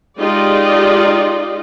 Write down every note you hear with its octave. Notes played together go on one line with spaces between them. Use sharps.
G#3 D#4 F4 G4 D5 D#5